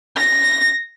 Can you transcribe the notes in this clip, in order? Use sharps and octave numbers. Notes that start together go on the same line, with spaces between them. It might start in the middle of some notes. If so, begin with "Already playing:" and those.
A#6